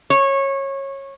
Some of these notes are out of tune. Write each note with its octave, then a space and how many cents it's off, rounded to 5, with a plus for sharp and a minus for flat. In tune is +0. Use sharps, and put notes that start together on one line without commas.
C#5 -20